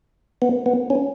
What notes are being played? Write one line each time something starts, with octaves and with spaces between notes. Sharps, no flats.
B3
B3
C#4